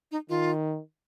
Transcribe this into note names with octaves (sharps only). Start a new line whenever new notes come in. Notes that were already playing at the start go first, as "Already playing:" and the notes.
D#4
D#3 F4